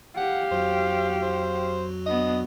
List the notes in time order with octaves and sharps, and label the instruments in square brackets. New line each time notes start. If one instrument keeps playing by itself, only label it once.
[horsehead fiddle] G4 F5 [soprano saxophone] F#5
[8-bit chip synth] F2 F#3 F#4 [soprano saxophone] C5
[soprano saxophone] C5
[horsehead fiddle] B3 D4 [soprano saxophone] D#5